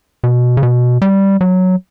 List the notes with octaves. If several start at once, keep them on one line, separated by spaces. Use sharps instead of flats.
B2
C#3
B2
G3
F#3